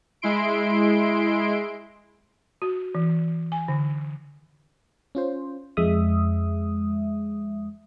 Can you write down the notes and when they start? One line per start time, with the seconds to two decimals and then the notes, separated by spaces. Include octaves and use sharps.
0.22 G#3 E4 C6 D7
2.62 F#4
2.95 E3
3.52 G#5
3.68 D3
5.15 C#4 F4 C5
5.77 F2 G#3 E5 D#6